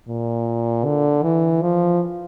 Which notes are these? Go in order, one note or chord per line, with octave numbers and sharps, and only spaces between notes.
A#2
D3
E3
F3